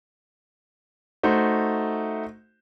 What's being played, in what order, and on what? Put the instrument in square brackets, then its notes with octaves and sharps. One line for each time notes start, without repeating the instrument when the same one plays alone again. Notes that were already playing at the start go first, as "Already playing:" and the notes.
[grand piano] A3 D#4 F#4 C5